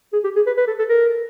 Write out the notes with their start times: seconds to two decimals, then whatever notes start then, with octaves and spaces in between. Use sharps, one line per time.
0.13 G#4
0.24 G4
0.36 G#4
0.47 B4
0.57 B4
0.68 A4
0.79 A4
0.89 A#4